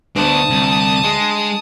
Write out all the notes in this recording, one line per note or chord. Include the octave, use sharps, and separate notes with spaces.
D2 B2 D4 A5 D#6
C2
G#3